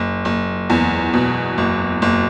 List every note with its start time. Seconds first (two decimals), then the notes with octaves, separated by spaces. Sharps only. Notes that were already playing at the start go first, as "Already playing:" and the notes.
Already playing: F#1
0.25 F#1
0.70 E2
1.13 B2
1.58 F#1
2.02 F#1